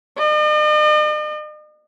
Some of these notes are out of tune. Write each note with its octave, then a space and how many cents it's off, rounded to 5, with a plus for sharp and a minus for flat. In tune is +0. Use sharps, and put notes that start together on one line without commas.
D#5 -45